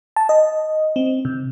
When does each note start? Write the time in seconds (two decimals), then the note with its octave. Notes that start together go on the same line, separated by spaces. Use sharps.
0.16 A5
0.29 D#5
0.96 C4
1.25 C3